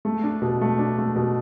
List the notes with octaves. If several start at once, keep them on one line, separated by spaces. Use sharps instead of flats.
A3
D4
B2
A3
D4
A3
B2